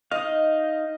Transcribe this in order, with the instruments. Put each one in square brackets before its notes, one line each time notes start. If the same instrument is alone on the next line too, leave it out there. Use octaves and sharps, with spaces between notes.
[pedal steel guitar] D#4 F5 [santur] D#5